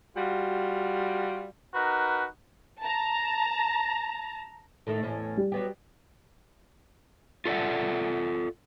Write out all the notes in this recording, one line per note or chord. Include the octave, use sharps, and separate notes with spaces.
G3 F4 F#4
D#4 F#4 A#4 B4
A5 A#5
A2 D#3 A3
E2 A2 C#4
G3
F#3 B3 G4
F4 A4 D5 E5 F#5